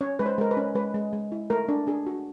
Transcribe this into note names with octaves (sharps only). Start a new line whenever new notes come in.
C#4 C#5
G#3 B4
C5
G#3 A#4
B4
C#4
G#3 B4
G#3
G#3
E4
A3 A#4
D4
D4 G#4
F#4